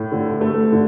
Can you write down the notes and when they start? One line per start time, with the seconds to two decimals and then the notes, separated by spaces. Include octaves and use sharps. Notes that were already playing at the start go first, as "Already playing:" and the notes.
Already playing: A2
0.12 D3
0.41 A3
0.72 D3